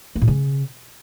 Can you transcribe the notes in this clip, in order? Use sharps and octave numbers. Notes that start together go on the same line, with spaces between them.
A#3
A2
C#3